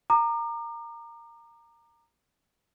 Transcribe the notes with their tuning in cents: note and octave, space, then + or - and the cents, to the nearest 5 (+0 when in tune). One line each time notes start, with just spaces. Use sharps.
A#5 -10 D6 +40